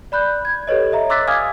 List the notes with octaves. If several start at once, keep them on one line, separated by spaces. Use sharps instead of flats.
D5 B5 F#6 G6
G#6
G4 A4 B4 C#5 D#5
D#5 E5 A#5
C6 D6 E6 F#6 A6 B6
F5 G#5 D6 D#6 F6 G#6